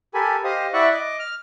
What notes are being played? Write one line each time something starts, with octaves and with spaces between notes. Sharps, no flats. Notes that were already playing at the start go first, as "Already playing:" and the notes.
G4 A4 A#4 G#5 B5
G4 C5 D#5 F5 D#6
E4 D5 E5 F#5 C#6 F#6
D#5 D6
F6